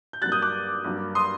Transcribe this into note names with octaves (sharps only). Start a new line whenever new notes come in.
G6
G2 F#3 A#3 F#6 A6
D#6 G6
D6 F#6
G2 F#3 A#3
C6 D#6